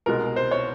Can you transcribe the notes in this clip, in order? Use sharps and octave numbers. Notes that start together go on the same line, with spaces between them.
C2 B2 G#3 A#4
C5
C#5